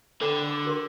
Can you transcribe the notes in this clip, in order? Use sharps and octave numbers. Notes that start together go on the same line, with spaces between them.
D3 A4 G5 B5
D6
F#4 A#4 C6